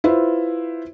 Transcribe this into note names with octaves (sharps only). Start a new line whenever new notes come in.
E4 F4 B4 C5 E5